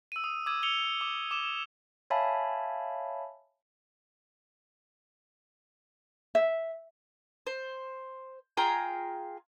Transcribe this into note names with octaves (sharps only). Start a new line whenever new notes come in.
E6 D#7
D#6
D6 E6 G#6 D#7
E6 C#7 F7 G7
D6
D6 E7 G7
C#5 E5 F5 G#5 A5 B5
E5
C5
F4 G#4 G5 A#5